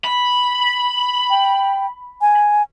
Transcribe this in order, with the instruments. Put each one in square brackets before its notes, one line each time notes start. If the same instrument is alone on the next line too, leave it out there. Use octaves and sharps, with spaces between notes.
[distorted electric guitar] B5
[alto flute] G5
G#5